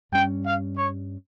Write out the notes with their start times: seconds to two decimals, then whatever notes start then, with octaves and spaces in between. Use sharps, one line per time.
0.12 G2 G3 C#4 G5
0.45 F5
0.77 C#5